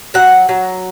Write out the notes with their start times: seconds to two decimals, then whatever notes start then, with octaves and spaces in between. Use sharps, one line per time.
0.14 F#3 F#5
0.49 F#3